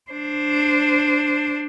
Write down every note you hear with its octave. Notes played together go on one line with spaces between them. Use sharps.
D4 C5